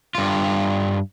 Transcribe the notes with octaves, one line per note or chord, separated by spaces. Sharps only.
G2 F4